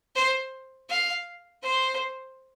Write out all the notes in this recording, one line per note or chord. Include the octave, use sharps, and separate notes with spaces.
C5
F5
C5